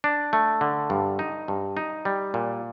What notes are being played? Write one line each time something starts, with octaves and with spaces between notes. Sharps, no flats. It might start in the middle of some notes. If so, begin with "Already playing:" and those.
D4
A3
D3
G2
D#4
G2
D#4
G3
A#2